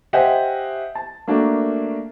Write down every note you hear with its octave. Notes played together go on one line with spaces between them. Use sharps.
G4 C5 D#5 E5 F#5 G#5
A5
A3 A#3 D4 F#4 A#4